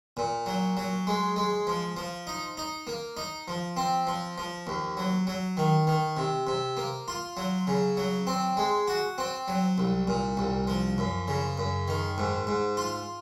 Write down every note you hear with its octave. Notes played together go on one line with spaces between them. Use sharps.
A#2
F#3
F#3
G#3
G#3
F3
F3
D#4
D#4
A#3
D#4
F3
C4
F3
F3
D#2
F#3
F#3
D#3
D#3
C3
C3
A#3
F4
F#3
C#3
F#3
C4
G#3
F#4
C4
F#3
C2
A#2
C2
F3
F#2
C#3
F#2
D#3
G#2
G#2
F4